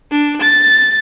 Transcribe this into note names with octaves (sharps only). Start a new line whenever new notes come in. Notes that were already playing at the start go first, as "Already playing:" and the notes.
D4
A6